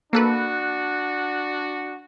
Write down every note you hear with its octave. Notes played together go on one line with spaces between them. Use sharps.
A#3 D4 F#4 A4 B4